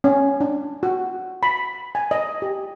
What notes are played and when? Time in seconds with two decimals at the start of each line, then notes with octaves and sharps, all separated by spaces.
0.04 C#4
0.41 D4
0.83 F#4
1.43 B5
1.95 G#5
2.11 D#5
2.42 G4